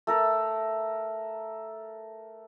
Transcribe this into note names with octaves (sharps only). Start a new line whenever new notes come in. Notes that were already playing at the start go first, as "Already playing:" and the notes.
A3 A4 A#4